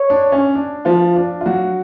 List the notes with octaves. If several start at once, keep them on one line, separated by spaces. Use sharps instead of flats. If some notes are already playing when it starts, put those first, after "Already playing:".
Already playing: C#5
D4
C#4
D4
F3 F4
D4
F4
F#3 F#4